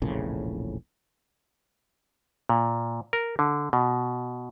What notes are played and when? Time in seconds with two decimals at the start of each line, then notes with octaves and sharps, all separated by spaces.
0.02 E1 A#1 A2 C#3
2.49 A#2
3.13 A#4
3.39 D3
3.73 B2